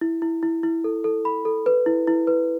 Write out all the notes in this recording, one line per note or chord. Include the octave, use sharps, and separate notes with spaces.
E4
E4
E4
E4
A4
A4
B5
A4
B4
E4
E4
B4